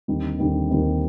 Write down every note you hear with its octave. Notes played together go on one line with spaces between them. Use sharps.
D#2 D3 G3 C4 D#4
D#2 D3 G3 C4 D#4
D#2 D3 G3 C4 D#4